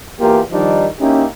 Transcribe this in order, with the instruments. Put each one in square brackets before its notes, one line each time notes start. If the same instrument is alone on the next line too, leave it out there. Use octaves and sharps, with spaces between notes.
[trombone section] E2 A#3 F4 G4
D#3 F3 G3 D4 D#4
A#3 C#4 D#4 E4 G4